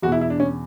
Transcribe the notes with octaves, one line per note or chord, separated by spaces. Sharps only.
E2 F#4
B2 E4
E4
D4
C#4